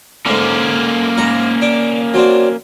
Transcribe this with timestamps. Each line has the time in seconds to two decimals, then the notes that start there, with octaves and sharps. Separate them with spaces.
0.26 G#2 D3 A#3 C#4
1.17 G#2 F#5 A#5
1.62 D4 D6
2.14 F#3 C4 D4